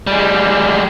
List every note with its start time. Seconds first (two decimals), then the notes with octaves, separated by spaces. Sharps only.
0.07 G3 G#3